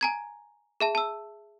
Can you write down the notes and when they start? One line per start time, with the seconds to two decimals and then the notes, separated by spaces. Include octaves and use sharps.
0.01 G#5 A#5 G#6
0.80 G#4 E5 A5
0.95 A5 E6